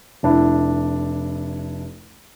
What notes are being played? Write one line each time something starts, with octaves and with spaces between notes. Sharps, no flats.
F1 D4 E4